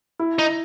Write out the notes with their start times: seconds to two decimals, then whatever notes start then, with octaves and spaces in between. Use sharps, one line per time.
0.19 E4
0.39 D#4